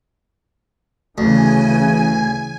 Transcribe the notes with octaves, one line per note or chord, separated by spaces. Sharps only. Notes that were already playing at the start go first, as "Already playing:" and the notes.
D2 C#3 E3 G#5